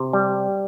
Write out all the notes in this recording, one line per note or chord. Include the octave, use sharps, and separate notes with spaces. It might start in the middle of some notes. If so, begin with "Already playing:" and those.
Already playing: C3
G3